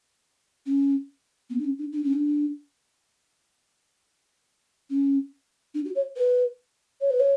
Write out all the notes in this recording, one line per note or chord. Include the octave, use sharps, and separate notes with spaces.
C#4
B3
D4
C#4
D4
D4
C#4
D4
C#4
D4
F#4
C#5
B4
C#5
B4
C#5